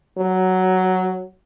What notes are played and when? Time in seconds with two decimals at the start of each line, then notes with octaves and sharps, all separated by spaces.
0.18 F#3